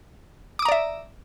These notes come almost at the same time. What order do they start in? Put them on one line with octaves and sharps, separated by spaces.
D6 D#6 A#5 D5 E5